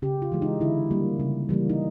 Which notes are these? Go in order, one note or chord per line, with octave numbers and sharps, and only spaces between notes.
C#3 G4
F4
E3 G#3
D#4
D3 E4
G3 A#3
C#3
E3 G3 A#3
D#4